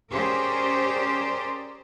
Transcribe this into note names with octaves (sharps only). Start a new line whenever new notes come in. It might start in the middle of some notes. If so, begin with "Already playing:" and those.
C#4 G4 G#4 A#4 C5 D5